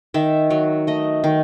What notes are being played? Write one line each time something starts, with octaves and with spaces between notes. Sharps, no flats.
D#3 E5
F#3
A3 D#5
D#3